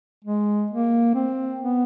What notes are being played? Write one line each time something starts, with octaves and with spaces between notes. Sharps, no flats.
G#3
A#3
C4
B3